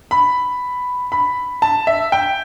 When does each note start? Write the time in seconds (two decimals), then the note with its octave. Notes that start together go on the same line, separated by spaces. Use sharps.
0.11 B5
1.12 B5
1.62 A5
1.87 E5
2.12 G5